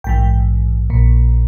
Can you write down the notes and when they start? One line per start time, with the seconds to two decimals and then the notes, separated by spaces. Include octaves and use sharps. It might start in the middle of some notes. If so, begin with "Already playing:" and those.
0.04 A#1 G#2 E3 G5
0.90 A#1 A#2